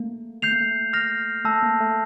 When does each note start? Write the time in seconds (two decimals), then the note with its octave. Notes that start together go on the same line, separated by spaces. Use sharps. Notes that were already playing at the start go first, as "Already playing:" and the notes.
Already playing: A3 A#3
0.42 A3 G6 C7 F7
0.52 A#3
0.61 A3
0.93 F6 A#6 F7
1.45 A3 A5 E6 A#6
1.63 A#3
1.80 A3